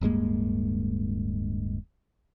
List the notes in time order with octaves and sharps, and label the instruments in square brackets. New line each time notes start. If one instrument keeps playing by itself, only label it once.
[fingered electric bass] D1 G2 G#3 A#3